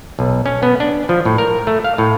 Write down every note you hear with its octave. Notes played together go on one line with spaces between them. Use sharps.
B1
C#4
B3
D4
F3
A2
A#4
A3
F5
A2